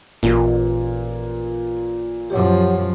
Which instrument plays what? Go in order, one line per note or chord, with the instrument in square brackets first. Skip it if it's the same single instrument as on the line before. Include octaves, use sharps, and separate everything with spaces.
[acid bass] A1 [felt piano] A#2
[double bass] F#2 F3 [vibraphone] G4 C#5 F#5